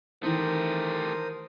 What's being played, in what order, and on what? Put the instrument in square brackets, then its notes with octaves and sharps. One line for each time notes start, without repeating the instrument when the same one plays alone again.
[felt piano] D#3 E3 [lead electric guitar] A3 G4 [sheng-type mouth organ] A#4 C5 D#6